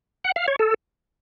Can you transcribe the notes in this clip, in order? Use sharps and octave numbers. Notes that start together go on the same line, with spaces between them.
F#5
F5
C#5
A4